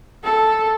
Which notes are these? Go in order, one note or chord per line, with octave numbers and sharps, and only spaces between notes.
A4